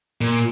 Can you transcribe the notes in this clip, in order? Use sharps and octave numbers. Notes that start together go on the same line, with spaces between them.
A#2